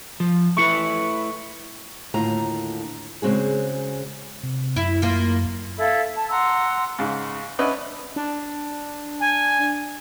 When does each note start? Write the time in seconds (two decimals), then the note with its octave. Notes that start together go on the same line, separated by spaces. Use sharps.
0.20 F3
0.57 A3 E4 B4 C#6 C#7
2.14 D#2 A2 D3 F4 A#5
3.22 C#3 G#3 C4 F#4 G#4
4.43 C3
4.76 F#2 E4
5.02 A#3 F4
5.77 E4 A4 F5 B5
6.14 A5
6.29 F#5 A#5 C6 E6
6.99 G#2 C#3
7.59 C#4 D4 B4 D#5 E5 F#5
8.16 D4
9.20 G#5